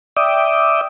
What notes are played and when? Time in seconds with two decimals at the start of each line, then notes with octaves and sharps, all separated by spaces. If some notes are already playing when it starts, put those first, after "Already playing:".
0.17 D5 E5 G5 D6 D#6